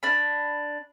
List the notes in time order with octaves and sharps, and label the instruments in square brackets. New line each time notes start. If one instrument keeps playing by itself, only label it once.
[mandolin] D4 B5